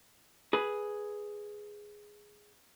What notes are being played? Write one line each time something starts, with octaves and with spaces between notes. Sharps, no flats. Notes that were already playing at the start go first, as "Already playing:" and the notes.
G#4 B4